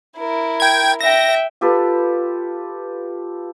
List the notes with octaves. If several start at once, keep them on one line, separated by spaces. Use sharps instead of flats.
E4 A#4
G5 G#6
E5 G5 A#6
F4 G4 A4 B4